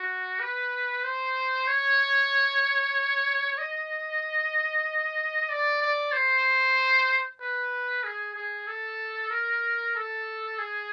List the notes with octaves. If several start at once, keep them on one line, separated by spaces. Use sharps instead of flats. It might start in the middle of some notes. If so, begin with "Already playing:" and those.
Already playing: F#4
B4
C5
C#5
D#5
D5
D5
C5
B4
G#4
G#4
A4
A#4
A4
G#4